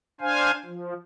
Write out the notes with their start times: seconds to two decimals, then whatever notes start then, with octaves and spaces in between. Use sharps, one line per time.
0.21 D4 C5 F5 G#5
0.65 F3